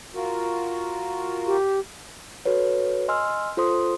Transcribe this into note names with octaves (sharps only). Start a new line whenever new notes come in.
F4 F#4 A#4
G4
F#4 A4 B4 C#5
D#5 G#5 C6 E6 F6
F4 A4 C5 C6 D#6